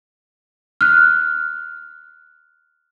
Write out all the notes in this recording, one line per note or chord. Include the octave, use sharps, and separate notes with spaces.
F6 F#6